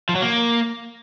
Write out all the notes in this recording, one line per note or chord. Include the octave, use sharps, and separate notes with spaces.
F3
F#3
A#3